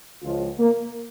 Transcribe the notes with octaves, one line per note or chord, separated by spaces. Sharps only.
C#2 C#3 F3 F4
A#3